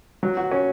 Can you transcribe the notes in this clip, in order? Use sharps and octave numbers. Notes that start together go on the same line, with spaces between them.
F#3
F#4
C#4